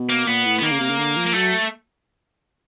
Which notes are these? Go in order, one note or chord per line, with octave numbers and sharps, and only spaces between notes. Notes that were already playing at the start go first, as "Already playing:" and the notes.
Already playing: B2
A#3
A#2 B3
A2
B3
D#3 A#3
C#3
C3
C#3
D3
F3
A#3
F#3 A3